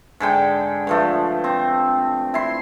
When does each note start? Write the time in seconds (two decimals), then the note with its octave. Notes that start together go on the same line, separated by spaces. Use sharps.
0.20 G#2 D3 G5
0.87 G2 F3 A3
1.44 C4
2.34 E4 C6